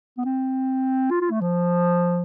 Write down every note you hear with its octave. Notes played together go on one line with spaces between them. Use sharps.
B3
C4
F4
F4
A3
F3